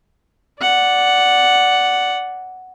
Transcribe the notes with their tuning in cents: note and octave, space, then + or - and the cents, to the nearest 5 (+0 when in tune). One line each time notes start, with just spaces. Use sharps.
D5 -10 F#5 +0